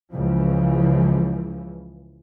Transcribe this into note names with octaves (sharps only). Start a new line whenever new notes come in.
C#2 C#3 E3 F3